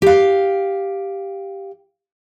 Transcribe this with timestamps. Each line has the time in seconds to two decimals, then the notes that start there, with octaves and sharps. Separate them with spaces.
0.02 G4 F5